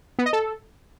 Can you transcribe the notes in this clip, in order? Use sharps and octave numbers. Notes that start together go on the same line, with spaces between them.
B3
D#5
A4